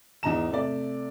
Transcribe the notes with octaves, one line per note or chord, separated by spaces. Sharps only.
E2 G#2 D#5 A#5 E7
C3 A3 D5